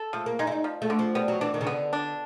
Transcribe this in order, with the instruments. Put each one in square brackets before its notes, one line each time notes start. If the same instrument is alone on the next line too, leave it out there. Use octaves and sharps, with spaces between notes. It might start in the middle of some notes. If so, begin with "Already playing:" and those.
Already playing: [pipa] A4
[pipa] F3 [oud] A3
[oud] A#3
[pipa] G#3 [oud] D#4
[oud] E4
D#4
[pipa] F3
[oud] A3
[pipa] D3
[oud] F3
[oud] G3 [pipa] B3
[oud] F#3
[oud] E3 [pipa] D4
[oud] D#3
C#3
[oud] D3 [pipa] B3
[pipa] D4